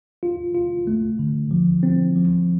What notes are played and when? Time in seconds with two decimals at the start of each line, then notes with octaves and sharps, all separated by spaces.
0.23 F4
0.55 F4
0.87 A3
1.19 D3
1.51 F3
1.83 C4
2.16 F3